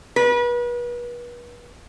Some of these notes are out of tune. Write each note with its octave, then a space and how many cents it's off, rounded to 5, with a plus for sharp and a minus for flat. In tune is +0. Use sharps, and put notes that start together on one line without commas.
B4 -35